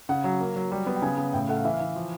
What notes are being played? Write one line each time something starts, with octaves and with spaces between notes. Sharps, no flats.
C#3 F#5
F#3
A#3
F#3
G3
B3
G5
C#3 G#5
C#3
A2 G5
A3 F#5
F5
E3 E5
F5
E3
F3